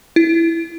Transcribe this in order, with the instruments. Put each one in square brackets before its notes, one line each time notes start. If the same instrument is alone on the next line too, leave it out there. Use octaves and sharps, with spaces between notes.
[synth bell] E4